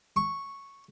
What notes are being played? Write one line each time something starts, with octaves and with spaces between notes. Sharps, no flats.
C#6